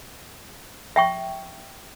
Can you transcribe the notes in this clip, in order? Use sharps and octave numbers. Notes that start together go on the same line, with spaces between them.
E5 G5 C#6